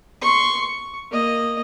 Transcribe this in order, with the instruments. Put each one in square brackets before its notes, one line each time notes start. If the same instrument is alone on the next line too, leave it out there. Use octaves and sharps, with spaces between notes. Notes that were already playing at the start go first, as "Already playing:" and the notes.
[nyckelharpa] C6 C#6
C#6
A#3 D#5